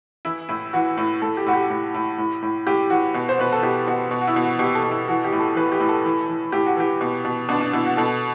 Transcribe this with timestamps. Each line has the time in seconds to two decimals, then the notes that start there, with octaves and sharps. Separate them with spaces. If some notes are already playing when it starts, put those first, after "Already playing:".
0.25 E3 E4
0.49 A2 E4
0.73 E3 F#4
0.97 A2
1.22 A2 A4
1.37 G4
1.46 A2 F#4
1.53 G4
1.70 A2
1.94 A2
2.18 A2
2.42 A2
2.67 A2 G4
2.90 E3 F#4
3.14 B2
3.29 C5
3.39 B2 B4
3.52 A4
3.63 B2 G4
3.87 B2 F#4
4.11 B2
4.21 F#4
4.27 E4
4.36 B2
4.43 F#4
4.59 B2 G4
4.75 A4
4.83 B2
4.91 E4
5.08 E3 F#4
5.24 G4
5.32 A2
5.40 A4
5.56 E3 B4
5.72 G4
5.80 A2
5.89 A4
6.05 E3
6.29 E3
6.52 A2 G4
6.66 F#4
6.77 E3 G4
7.01 B2
7.25 B2
7.49 B2 D4
7.61 D4
7.73 B2 E4
7.85 F#4
7.97 B2 A4